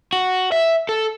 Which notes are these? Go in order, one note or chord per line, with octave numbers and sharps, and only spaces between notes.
F#4
E5
A4